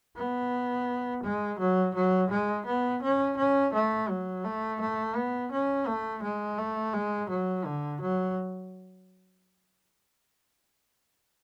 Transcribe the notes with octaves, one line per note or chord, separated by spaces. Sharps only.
B3
G#3
F#3
F#3
G#3
B3
C#4
C#4
A3
F#3
A3
A3
B3
C#4
A3
G#3
A3
G#3
F#3
D3
F#3